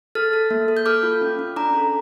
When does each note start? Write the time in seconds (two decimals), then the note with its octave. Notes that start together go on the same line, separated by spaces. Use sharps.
0.15 A4 F6 A6
0.33 A4
0.50 A#3
0.68 A4
0.77 G6
0.86 A4 D6 F6
1.03 F4
1.21 C#4
1.39 C#4
1.56 D4 A#5 D6
1.74 A4